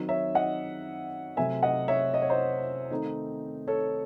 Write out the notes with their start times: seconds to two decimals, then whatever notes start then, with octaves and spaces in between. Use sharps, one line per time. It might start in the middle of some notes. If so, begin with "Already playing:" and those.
Already playing: D#3 F#3 C4 D#4
0.09 C#5 E5
0.35 D#5 F#5
1.37 C3 F#3 A3 C4 E5 G#5
1.63 D#5 F#5
1.88 C#5 E5
2.14 D#5
2.22 C#5
2.30 C5 D#5
2.91 D#3 A3 C4 D#4
3.67 A4 C#5